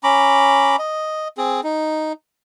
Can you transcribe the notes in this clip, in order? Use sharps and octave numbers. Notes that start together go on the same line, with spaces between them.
C#4 A#5 B5 D6
D#5
C4 G#4
D#4